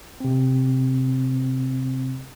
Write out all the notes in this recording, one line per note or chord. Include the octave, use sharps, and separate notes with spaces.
C3 C4